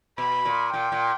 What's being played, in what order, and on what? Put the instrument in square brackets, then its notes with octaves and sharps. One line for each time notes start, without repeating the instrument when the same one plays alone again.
[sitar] B2 [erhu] B5
[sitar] A#2
[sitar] A#2 [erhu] G5
[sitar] A#2